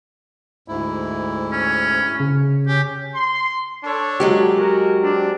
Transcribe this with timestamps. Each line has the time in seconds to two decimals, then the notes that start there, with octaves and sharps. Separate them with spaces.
0.68 D2 G#2 E4
1.52 C#4
2.20 C#3
2.67 C#4 G4
3.15 C6
3.84 D4 A4 C#5
4.20 F#3 G#3 G4
4.56 F#4 A#4
5.03 C4 D4